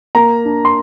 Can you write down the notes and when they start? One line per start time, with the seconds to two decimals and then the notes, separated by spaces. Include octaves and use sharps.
0.15 A#3 A#5
0.45 D4
0.65 C6